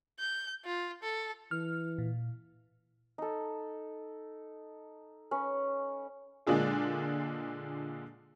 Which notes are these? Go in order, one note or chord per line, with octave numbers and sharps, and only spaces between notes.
G6
F4
A4
E3 F6
A#2
D#4 A4
C#4 B4
A#2 D3 G#3 D4 F4 G#4